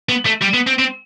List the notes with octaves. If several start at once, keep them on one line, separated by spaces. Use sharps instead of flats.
B3
A3
G3
B3
C4
C4